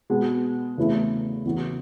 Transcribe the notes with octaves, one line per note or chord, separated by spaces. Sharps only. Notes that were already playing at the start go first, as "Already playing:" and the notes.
B2 G#3 B3
E2 C#3 E3 A3 E4
E2 C#3 E3 B3 F#4